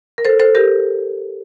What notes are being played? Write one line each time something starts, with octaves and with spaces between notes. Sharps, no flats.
A#4
A4 C5
A4 C5
G4 A#4